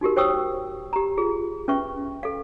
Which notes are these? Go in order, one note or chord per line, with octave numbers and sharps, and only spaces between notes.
D#4 F#4 G4 A#4
C5 C#5 G5 C#6 D#6 E6
G4 A#5
F4 G#4
C#4 B4 E5 C#6
A4 F5